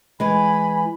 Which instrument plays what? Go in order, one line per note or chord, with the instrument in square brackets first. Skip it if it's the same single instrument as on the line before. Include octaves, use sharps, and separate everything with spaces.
[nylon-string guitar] E3 G#3 [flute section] G#5 B5